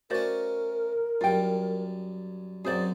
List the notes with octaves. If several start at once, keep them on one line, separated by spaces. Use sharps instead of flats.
A3 C#4 F#4 A#4 C5 D5
F#2 G3 F4 G5
F#2 F#3 C4 G#4 C5 D5